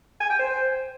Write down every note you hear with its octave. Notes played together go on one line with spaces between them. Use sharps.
G#5
G5
C5